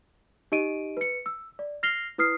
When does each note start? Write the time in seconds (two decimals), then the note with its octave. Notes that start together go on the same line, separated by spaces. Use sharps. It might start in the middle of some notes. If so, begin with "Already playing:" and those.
0.52 D#4 G4 D#5 D7 D#7
0.97 B4 C#7
1.26 E6
1.59 D5
1.83 F6 A#6 C7 F7 G7
2.18 E4 B4 D#6 F6 C7